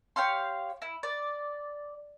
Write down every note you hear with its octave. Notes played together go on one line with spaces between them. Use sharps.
G4 C#5 F5 C6
E4
D5